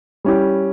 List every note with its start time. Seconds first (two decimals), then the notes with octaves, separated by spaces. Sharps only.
0.25 G3 C#4 E4 G4